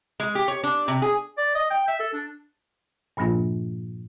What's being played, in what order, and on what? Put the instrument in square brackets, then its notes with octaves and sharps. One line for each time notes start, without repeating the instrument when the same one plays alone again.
[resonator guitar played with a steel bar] G#3
G4
C#5
D4
C3
G#4
[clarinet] D5
D#5
G5
E5
A4
D4
[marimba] G2 A#2 F3 A#3 D4 F4